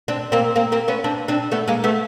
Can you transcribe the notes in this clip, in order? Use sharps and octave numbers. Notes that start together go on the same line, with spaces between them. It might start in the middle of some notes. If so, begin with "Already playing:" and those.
C4 D4
A#3 C4
A#3 C4
A#3 C4
B3 C#4
C4 D4
C4 D4
A3 B3
G#3 A#3
A3 B3